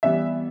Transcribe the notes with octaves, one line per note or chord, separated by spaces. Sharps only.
E3 G3 B3 E5